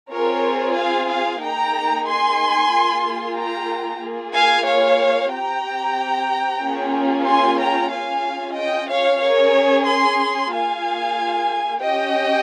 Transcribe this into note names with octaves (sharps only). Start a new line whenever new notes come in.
C4 F4 G#4 A#4 C#5
F5 G#5
F5 G#5
A#3 D#4 G#4 G5 A#5
G#5 C6
A#3 F4 G#4
G5 A#5
A#3 F4 G#4
F5 G#5
C#5 F5
C4 G4 G5 A#5
A#3 C#4 F4 G#4
G#5 C6
G5 A#5
C#4 F4 G#4 F5 G#5
D#5 G5
C#5 F5
C#4 G#4 A#4 C#5
G#5 C6
A#3 F4 G#4 F5 G#5
C#4 G4 D#5 G5